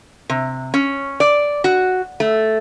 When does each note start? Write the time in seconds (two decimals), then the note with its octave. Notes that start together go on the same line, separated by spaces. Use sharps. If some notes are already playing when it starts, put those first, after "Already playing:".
0.30 C3
0.74 C#4
1.20 D5
1.64 F#4
2.20 A3